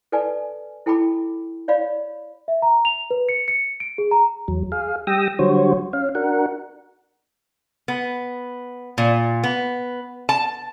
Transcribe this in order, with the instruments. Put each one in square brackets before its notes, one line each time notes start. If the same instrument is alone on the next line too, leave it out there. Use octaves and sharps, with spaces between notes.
[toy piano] A4 B4 D5 G#5 A5
E4 A4 G5 A5 B5 D6
C#5 D5 F5 B5
[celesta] E5
A#5
F7
B4
C#7
C#7
D7
G#4
A#5
[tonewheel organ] E2 F#3
G#4 F5
G3 G5 D#6 E6 A#6
D3 F#3 G3 F#4 C5 C#5
C#4 F5
D4 F#4 A#4 F#5
[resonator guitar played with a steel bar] B3
A#2
B3
A5